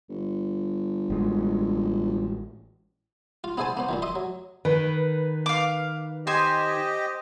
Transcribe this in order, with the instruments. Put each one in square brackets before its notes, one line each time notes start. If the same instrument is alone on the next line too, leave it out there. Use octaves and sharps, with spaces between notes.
[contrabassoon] G1
[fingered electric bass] A1 G#3
[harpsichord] F4
B3 E4 G#4 C5 G#5 A5
A#3 B3 C5
A#2 D#3 E3
D#5 E5 C6
F#3
[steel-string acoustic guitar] D#3 [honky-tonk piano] B4
[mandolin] F5 D6
[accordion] G4 D#5 [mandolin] C5 G#5